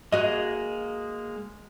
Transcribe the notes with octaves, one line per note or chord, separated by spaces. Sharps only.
G#3 A#3 F#4 G#4 D#5